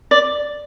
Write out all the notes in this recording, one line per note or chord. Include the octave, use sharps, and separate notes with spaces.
D5